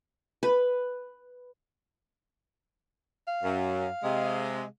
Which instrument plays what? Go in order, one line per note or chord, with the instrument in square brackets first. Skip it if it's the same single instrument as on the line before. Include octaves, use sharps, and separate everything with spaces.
[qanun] B4
[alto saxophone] F5
[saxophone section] F#2
C3 G#3